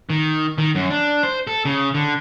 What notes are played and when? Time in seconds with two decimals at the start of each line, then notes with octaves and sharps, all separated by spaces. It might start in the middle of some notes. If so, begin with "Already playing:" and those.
0.10 D#3
0.58 D#3
0.75 F#2
0.90 D4
1.23 C5
1.47 A4
1.65 C#3
1.94 D3